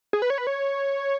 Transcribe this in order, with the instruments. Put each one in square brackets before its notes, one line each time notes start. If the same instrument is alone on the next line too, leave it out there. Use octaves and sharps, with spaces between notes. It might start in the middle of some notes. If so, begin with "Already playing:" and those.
[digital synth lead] G#4
B4
C#5
B4
C#5